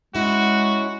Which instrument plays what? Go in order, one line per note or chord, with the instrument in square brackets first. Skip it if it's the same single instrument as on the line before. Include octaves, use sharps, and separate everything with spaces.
[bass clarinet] G#3 [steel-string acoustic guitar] C#4 E4 [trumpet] F#4